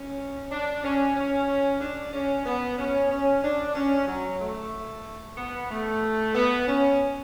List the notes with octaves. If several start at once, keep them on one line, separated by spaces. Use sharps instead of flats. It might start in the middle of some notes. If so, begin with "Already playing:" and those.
Already playing: C#4
D4
C#4
C#4
D4
C#4
B3
C#4
C#4
D4
C#4
F#3
A3
B3
A3
B3
C#4